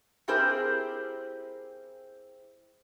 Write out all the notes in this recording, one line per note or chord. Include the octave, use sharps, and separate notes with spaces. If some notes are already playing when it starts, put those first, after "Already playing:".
C4 E4 G4 G#4 A#4 C5